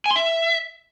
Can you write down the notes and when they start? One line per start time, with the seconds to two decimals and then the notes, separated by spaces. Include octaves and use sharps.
0.06 G#5
0.11 C6
0.16 E5